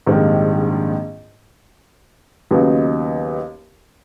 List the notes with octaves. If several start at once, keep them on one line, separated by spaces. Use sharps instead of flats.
A#1 G#2 D#3 G3 C4
D#2 C#3 F#3 B3 D#4